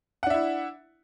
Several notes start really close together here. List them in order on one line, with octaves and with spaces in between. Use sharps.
F#5 D4 E5 E4